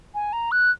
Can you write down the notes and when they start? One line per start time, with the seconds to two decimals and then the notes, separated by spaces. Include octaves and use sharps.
0.14 G#5
0.33 A#5
0.52 F#6